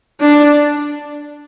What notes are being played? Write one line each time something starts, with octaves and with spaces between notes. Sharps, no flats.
D4